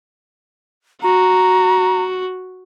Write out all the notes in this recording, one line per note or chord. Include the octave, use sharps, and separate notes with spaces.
F#4 A#5